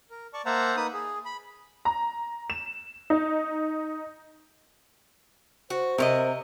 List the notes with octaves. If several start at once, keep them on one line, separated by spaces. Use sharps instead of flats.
A#4
D5 A5 C#6
A#3 C5 E5 F#5 A5 A#5
A#3 D#4 B4 D#6
G#4
B5
A#5
E7
D#4
F#4 C5
C3 A#4 C#5 D#5